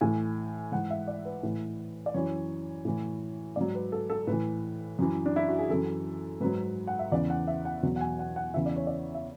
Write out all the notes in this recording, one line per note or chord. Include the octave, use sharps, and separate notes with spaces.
A2 E3 G#5
G#2 E3 F#5
E5
D5
B4
A2 E3
D5
F#2 E3 C#5
A2 E3
G#2 F#3 D5
B4
A4
A4
A2 B4
E3
F#2 E3
D4
E4
F#4
G#4
F#2 E3 A4
G#2 F#3 B4
F#5
E5
E2 C#3 E3 D5
F#5
E5
F#5
E2 B2 F#3
F#5
G#5
F#5
F#5
E2 C#3 E3 E5
D5
C#5
D5
E5